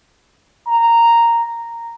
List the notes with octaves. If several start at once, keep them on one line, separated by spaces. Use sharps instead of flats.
A#5